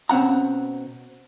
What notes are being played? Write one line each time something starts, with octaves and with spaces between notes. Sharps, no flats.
B2 C4 C#4 F#5 A#5